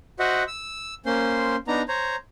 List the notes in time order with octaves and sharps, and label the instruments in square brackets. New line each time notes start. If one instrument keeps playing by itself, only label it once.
[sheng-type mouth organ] F#4 C5 D#5 E5 F#5
E6
A#3 C#4 C5 C6
B3 D4 D#4 A#5
C5 C#5 A#5